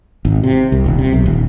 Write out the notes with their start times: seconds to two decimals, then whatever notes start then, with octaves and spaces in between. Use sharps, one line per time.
0.25 G#1
0.44 C3
0.72 C2
0.86 D#1
0.99 C3
1.13 B1
1.26 D#1